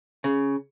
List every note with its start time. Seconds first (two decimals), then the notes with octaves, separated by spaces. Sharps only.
0.24 C#3